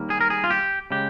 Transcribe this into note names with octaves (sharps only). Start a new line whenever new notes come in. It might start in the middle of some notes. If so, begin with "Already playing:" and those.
Already playing: D#2 D#3 G3 A#3
G#4
A#4
G#4
F4
G4
C#3 G#3 G4